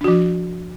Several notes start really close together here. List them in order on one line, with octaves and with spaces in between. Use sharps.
D4 F#4 F3